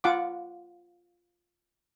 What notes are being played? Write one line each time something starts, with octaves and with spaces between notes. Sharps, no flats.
F4 F#5 D6